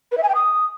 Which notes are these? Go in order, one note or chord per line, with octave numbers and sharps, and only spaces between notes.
B4
E5
G#5
G5
D#6